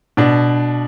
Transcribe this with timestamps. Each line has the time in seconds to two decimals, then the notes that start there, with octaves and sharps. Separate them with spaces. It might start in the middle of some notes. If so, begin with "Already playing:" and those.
0.17 B2 D4